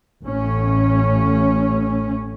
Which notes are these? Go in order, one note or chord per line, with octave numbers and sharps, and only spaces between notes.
A1 A2 C#4